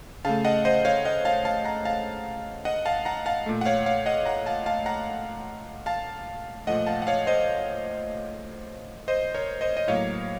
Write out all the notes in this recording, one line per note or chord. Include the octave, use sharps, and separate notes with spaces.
C#3 A3 F5 A5
D#5 F#5
C5 D#5
C#5 F5
D#5 F#5
F5 A5
F5 A5
F#5 A#5
F5 A5
D#5 F#5
F5 A5
F#5 A#5
F5 A5
A#2 A3
F#5
C#5 F5
C#5 F5
D#5 F#5
F#5 A#5
F5 A5
F5 A5
F#5 A#5
F5 A5
A#2 F3 A3 D#5 F#5
F5 A5
F#5
C#5 F5
C5 D#5
C5 D#5
A#4 C#5
C5 D#5
D#5
A2 F#3 A#3 C#5 F5